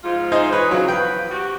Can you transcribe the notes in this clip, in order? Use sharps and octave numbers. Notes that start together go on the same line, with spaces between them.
G#2 F3 F4
D#4 G#4 C5
E3 G#4 B4 C#5
C#3 F#3
E2 F3 B4 G5
F#4 G4